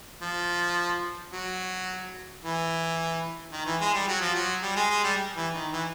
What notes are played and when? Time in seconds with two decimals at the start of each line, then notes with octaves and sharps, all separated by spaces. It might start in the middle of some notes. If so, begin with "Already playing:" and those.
0.22 F3
1.32 F#3
2.43 E3
3.52 D#3
3.66 E3
3.81 G#3
3.94 G3
4.08 F#3
4.21 F3
4.35 F#3
4.63 G3
4.76 G#3
4.90 G#3
5.04 G3
5.36 E3
5.54 D#3
5.73 E3